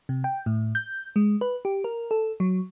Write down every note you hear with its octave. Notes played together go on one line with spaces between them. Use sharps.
C3
G5
A2
G6
G#3
B4
G4
A#4
A4
F#3